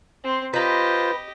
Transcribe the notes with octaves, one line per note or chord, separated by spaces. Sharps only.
C4 C6
F4 G4 B4 C5 D#5 A#5